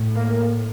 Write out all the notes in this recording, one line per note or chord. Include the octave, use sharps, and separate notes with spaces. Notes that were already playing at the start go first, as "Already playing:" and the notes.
Already playing: A2
A#3